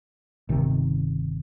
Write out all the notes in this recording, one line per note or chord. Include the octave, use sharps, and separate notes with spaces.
G1 D#2 C3 D#3